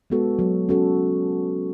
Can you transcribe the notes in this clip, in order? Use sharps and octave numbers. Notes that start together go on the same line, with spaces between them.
G#3 B3 F#4 A4
F#3
C#4 F#4 A4